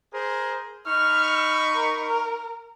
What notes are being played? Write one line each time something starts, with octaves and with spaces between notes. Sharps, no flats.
G#4 A#4 C5
D#4 B5 C#6 F6
A#4